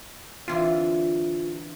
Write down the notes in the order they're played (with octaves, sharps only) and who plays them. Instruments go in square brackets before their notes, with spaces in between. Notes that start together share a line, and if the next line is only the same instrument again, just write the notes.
[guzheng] D3 E3 C4 [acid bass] F4